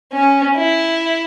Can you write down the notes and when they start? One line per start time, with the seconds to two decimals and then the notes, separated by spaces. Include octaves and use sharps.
0.13 C#4
0.57 E4